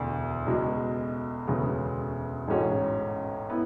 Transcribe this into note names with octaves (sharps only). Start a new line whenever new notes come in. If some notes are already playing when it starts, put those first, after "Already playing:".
Already playing: E1 D2 D3
C#2 B2 G#3
E1 D2 C#3 G#3 B3
A1 G#2 G#3 C#4 F#4
B3 E4